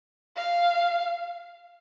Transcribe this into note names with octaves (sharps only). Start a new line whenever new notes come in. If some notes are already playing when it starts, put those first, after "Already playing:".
F5